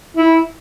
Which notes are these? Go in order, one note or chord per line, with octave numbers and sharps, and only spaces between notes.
E4